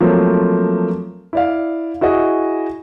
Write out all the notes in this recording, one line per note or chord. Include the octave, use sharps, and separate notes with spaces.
F3 F#3 A3 A#3 C4
E4 D5 F5
E4 F#4 G#4 D#5